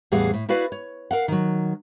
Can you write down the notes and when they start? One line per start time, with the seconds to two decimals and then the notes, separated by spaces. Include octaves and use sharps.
0.12 E2 A2 G3 G#4 F5 F#5
0.34 A2
0.49 E4 F#4 B4 D5 F5
0.72 C#5
1.11 A#4 F5 F#5
1.28 D#3 F#3